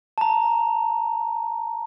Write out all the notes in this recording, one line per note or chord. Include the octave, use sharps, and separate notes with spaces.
A5 A#5